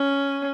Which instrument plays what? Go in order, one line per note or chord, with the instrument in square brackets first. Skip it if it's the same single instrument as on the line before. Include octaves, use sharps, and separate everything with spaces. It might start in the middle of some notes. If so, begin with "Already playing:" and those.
Already playing: [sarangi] C#4